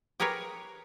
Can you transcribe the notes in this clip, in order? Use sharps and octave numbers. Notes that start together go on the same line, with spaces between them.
G4 G#4 A#4 B4 C#5